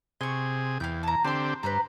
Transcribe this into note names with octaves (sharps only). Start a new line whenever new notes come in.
C3 G#4 C6 C#6
E2 F5 G5 G6
A5 A#5
D3 C4 G4 A5 C6
G2 B4 C5 A#5